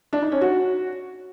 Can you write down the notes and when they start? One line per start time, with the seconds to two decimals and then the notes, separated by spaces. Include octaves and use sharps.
0.13 D4
0.22 D#4
0.32 C#4
0.41 F#4